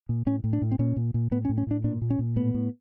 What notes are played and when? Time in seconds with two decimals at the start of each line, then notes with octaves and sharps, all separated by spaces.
0.09 A#2
0.26 A2 C#4
0.44 A2
0.53 D4
0.62 A2
0.72 C4
0.79 A#2 C#4
0.96 A#2
1.14 A#2
1.31 A2 B3
1.45 C#4
1.49 A2
1.58 C#4
1.67 A2 D4
1.84 A#2 D4
2.02 A#2
2.10 C#4
2.19 A#2
2.36 A2 B3
2.54 A2